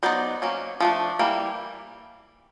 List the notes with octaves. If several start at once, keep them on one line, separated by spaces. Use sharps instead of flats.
F#3 B3 D#4 C5 D5
F#3 A#3 C#4
F3 A3 D4
E3 G3 A#3